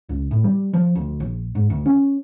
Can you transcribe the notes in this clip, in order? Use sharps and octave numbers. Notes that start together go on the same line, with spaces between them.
C#2
A2
G3
F3
D2
A#1
G#2
D2
C#4